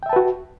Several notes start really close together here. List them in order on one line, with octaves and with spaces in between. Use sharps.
G5 E5 A5 B4 F#4